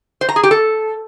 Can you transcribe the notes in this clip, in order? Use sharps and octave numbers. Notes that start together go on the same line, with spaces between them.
C5
A#5
G#4
G4
A4